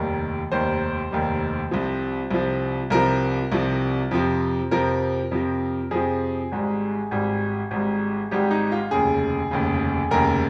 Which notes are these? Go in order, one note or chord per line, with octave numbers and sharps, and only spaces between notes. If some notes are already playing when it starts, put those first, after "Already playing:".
Already playing: F1 D#2 D#3 G3
F1 D#2 D#3 G3 C5
F1 D#2 D#3 G3
C2 C3 F3
C2 C3 F3
C2 C3 F3 A#4
C2 C3 F3
F2 C3 F3
F2 C3 F3 A#4
F2 C3 F3
F2 C3 F3 G#4
G#1 G#2 G3
G#1 G#2 G3
G#1 G#2 G3
G#1 G#2 G3 G4
D#4
F4
F1 D#2 C#3 G#4
F1 D#2 C#3
F1 D#2 C#3 A#4